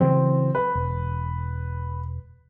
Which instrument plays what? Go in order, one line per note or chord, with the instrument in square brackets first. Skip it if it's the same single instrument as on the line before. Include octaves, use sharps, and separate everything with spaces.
[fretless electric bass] C#3 E3 F#3 [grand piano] C4
[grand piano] B4
[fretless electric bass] E1